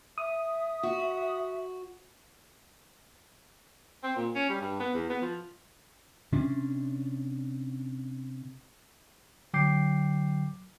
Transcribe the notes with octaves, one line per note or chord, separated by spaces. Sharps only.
E5 D#6
F#4
C4
A#2
C#4
G3
G2
B3
E2
B3
F3
C3 C#4 D4
D3 F#3 G5 D6 G6 C7